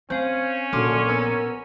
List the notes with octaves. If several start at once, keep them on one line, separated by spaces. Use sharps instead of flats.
C4 C#4 C5 F5 G#5
A#1 F#2 D3 C6 D6 F6
B3 A#4 G#5 A#5 E6